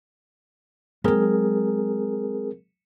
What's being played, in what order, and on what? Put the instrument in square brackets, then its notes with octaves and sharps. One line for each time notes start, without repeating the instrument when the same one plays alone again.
[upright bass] F#3 G#3 [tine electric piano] C4 G#4 A#4